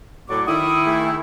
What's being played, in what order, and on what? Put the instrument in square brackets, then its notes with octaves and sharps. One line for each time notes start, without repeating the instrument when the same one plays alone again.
[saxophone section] A2 F#3 [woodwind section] D5 C#6 D6
[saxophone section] D#3 E4 [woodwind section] D#6
[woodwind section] A3 G4 G#4